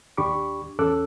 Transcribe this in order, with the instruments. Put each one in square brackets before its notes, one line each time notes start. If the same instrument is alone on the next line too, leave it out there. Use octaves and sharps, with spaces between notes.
[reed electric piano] D#2 D4 G4 B5 C#6 D6
E2 C#4 A4 D6 E6 F#6